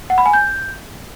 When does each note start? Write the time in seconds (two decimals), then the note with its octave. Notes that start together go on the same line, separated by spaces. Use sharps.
0.10 F#5
0.18 B5
0.26 G#5
0.33 G6